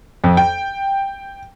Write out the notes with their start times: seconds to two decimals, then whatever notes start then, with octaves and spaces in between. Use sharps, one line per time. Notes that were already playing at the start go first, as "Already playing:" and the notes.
0.24 F2
0.37 G5